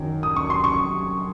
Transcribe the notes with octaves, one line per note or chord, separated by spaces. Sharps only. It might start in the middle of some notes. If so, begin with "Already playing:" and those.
Already playing: F#2 D#3 F#3
D#6
C#6
C6
C#6